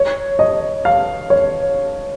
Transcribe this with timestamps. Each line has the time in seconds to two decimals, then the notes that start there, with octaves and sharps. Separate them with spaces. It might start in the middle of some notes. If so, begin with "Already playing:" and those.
Already playing: C#5
0.39 D#5
0.85 F5
1.30 C#5